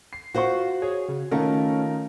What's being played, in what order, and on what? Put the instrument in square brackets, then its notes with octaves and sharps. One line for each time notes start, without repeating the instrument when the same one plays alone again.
[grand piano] C7
[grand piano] F4 F#5 C#6 [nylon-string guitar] F#4 C5
[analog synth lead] G#4 [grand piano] C#5
[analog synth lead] C#3
[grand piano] D#3 F4 A#4 [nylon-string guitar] A3 [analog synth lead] C#4